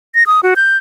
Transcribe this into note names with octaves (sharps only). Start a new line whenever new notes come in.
A#6
D#6
F#4
G6